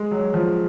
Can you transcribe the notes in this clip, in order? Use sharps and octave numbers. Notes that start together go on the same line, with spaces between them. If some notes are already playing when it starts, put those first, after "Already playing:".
Already playing: G#3
F#3
F3